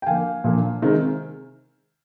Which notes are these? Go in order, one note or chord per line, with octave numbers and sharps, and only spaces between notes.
G5
D3 F3 A#3 F5 G#5
A#2 F3 A#3 D4
C3 D#3 G#3 C4